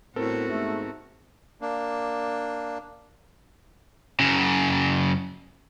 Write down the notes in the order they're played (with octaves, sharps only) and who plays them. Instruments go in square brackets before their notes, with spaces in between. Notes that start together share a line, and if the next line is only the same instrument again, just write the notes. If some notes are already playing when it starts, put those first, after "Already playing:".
[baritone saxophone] A2 [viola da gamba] B3 F#4 [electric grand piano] C4 A4 A#4
[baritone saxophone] G#2 [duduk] A3
[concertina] A#3 D4
[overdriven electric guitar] F#2 C#3